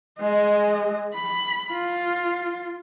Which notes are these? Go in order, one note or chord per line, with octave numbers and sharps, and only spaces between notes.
G#3 D#5
B5
F4